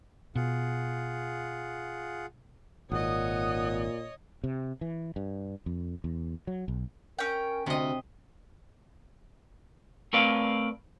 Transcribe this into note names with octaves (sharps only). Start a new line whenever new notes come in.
B2 F4 G#4 F#5
G#1 A#2 C#5 D#5 F#5 D#6
C3
E3
G2
F2
E2
F#3
B1
C#4 A#4 G5
D2 C3 C4 D#5
A3 C4 A#4 B4 D5 F5